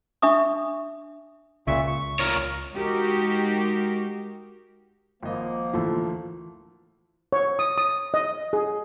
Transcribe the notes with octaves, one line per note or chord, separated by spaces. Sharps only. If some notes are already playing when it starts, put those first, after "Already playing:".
D4 E5 C#6 D#6
C#2 A#2 C#3 E5 C#6
C#6
F4 A#4 C#5
G#3 D#4 F#4 G4 A#4
G#1 F3 A#3 D#5
D2 A2 E3 F4 A4
C#5
D#6
D#6
D#5
G#4